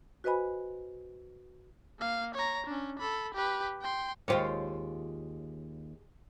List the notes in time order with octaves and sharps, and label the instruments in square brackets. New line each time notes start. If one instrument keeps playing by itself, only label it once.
[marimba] F#4 B4 C5 D#5 G#5 B5
[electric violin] A#3 F5
C#5 A#5
C#4 D4
A4 B5
G4 B4
G5 C6
[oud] D#2 F4 C#5 [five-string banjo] G#3 G4 C5